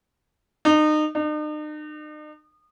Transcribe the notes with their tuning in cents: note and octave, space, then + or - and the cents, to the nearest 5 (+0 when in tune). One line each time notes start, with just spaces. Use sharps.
D#4 -30
D#4 -45